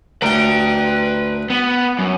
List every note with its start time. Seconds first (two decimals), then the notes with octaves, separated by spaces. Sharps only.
0.22 D2 B4 G5 A#5
1.50 B3
1.99 F#2